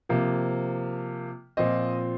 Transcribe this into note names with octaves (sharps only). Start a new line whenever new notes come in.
C3 F3 A#3
A#2 F3 C4 D#5